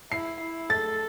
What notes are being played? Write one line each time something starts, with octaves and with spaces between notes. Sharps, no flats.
E4 C7
E4
A4 A6